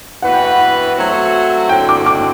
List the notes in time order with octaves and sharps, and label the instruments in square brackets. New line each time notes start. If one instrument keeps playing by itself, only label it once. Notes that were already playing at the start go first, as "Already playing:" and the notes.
[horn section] E3 B3 F#4 B4 [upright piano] F#5
[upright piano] G5
F#5
[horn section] F#3 A3 C4 F#4
[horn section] D3 F#3 C4 [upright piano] G5
[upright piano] D6
D6